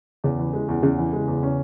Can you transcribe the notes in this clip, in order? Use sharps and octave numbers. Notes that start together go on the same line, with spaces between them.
E2 C#3
E3
G#3
E2
E2 C#3
E3
G#3
E2
C#4